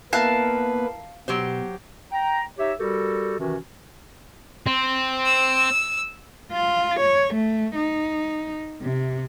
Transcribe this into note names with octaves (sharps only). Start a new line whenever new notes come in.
A#3 B3 E4 A#4 B4 F5 A5 F#6
B2 F#3 G4 C5
G5 A#5
D#4 G4 C#5 E5
G3 F#4 G4 A4 A#4
C3 D#3 E3 C#4 F#4
C4
E6
F4
C#5
A3
D#4
C3